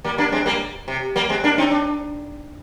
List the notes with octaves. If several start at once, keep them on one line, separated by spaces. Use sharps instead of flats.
G3 A#3
A#3 D4
G#3 C4
G3 A#3
C3
G3 A#3
G#3 C4
A#3 D4
C4 D#4
D4